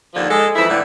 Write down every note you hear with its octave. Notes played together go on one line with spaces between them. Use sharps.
D#2 D3 F3
G#3 A4
F2 E3 E4
A2 D3 E3 A3